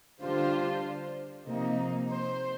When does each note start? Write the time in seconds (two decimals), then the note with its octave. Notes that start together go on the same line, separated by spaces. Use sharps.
0.21 D3 G3 D4 F4 C5
1.46 C3 F3 A#3 D#4
2.09 C5